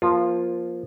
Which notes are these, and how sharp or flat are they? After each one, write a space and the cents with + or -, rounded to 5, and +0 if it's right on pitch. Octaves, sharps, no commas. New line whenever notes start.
F3 +0 A#3 +25 F4 +0